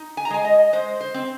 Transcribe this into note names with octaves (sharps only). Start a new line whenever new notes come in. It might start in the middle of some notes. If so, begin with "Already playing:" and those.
Already playing: D#4
G#5
A#5
G#3 G#5
D#5
G#3 C5
C5
C4